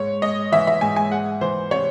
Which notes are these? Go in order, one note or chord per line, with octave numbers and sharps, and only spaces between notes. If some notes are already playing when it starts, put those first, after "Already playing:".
Already playing: G#2 C#5
G#3 D#5
E3 E5
E5
G#2 G#5
G#5
G#3 F#5
E3 C5
C3 C#5